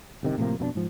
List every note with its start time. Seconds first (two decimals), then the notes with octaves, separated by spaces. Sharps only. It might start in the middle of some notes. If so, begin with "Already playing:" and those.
0.23 G1 C3 D#3
0.38 A2 C3 F3 A#3
0.59 F2 B2 A#3 D4
0.75 G#2 F3